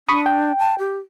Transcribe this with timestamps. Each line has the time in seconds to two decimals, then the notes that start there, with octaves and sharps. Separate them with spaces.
0.09 D4 B5 C#6 D#6
0.26 G5
0.59 A5
0.79 G4